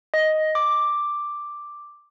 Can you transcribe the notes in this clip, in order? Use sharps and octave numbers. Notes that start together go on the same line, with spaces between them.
D#5
D6